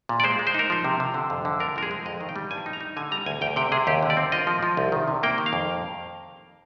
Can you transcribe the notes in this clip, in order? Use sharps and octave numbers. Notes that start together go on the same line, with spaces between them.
A#2
D5
G#3 C5
G#3
C5
D#4 A#4
F3 C5
C3
C3
D3
F2
D3
D4 A#4
F3 A#4
G#4
G#3
F2 D#5
D#3
G5
G3
G2 G#5
D#4
A#5
D#4
D3 G#5
G3 A#5
D2 G#5
D2 G5
C3 G5
C3 G#4
D#2 G4
D3
D5
C4
F4 D#5
F3
F3
C2
D#3
C3
A#3 G5
D#3
F5
F2